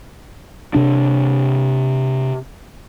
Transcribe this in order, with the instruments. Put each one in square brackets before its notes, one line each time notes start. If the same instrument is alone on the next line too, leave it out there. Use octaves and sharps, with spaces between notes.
[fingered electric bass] C3 D4